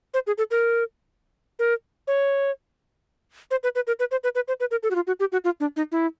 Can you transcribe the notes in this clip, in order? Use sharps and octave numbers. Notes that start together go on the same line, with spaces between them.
C5
G#4
A4
A#4
A#4
C#5
C5
B4
B4
A#4
B4
C5
B4
B4
C5
B4
A#4
A4
F#4
F4
F#4
G4
F#4
F4
D4
D#4
E4